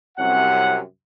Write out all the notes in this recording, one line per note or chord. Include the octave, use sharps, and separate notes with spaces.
C2 F#2 C3 C#4 F#5